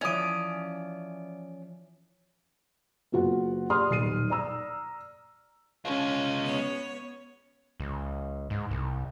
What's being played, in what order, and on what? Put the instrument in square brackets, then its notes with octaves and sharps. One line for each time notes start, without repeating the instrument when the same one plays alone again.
[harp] E3 F3 E4 [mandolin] C#4 D#6 [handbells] D5 D7
[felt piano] F#1 B3 F4 F#4 F#5
G4 D5 C6 D#6 F6
D#1 B1 C7 D#7
D5 A#5 E6
[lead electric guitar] G#3 F4 [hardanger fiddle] C#4
[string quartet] B3 C#5
[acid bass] C#2
G#2
C2